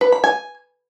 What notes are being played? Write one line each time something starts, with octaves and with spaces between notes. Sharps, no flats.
B4
B5
G#5